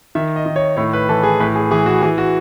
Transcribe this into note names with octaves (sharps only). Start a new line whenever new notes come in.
D#3 E5
D#5
D#3
C#5
A2 C#5
B4
E3 A4
G#4
A2 B4
G#4
E3 G#4
F#4
E3 G#4
F#4